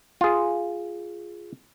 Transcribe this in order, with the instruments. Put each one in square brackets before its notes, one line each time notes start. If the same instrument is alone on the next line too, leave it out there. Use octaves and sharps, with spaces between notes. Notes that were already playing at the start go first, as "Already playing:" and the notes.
[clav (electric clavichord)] F4 G#4